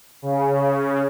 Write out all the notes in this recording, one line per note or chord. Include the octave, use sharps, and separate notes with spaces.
C#3